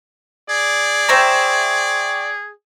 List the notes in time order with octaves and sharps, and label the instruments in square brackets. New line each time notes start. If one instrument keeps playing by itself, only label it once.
[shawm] G#4 [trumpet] D5
[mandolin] C5 E5 A#5 [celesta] G5 C#6